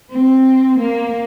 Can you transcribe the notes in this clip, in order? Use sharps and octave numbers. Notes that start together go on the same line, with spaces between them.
C4
A#3